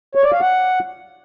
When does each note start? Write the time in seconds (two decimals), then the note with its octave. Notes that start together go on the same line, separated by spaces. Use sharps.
0.15 C#5
0.24 D5
0.32 F5
0.41 F#5